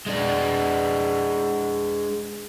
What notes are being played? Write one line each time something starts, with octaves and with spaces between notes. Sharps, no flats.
G#3 D4